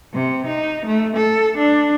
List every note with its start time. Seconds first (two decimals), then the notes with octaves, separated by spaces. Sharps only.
0.13 C3
0.46 D#4
0.85 A3
1.16 A4
1.58 D4